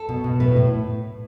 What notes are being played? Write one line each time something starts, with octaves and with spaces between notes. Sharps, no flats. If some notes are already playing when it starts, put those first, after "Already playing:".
Already playing: A4
B2
B2
A2 B4
A2